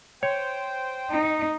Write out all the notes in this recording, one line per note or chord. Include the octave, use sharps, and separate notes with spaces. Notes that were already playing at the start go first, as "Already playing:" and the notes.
C5 C#5 G5
D#4